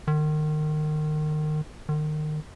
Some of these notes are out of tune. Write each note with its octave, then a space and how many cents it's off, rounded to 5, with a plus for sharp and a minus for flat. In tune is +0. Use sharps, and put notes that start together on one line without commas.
D#3 -30
D#3 -30